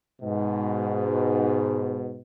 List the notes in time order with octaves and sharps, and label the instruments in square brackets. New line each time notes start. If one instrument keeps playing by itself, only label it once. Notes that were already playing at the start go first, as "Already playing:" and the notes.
[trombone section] G#2 B2